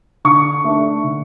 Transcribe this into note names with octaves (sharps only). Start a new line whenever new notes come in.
D3 C#6
A3 D4
D3